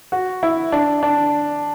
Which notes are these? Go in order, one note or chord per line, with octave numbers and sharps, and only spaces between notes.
F#4
E4
D4
D4